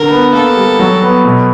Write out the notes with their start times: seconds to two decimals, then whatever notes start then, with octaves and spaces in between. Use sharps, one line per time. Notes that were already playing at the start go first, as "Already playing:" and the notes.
Already playing: D3 A#4
0.10 B3
0.33 A#3 A4
0.56 G3
0.79 F#3
1.02 B3
1.25 B2